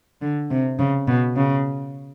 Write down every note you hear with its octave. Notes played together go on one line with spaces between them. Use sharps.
D3
C3
C#3
B2
C#3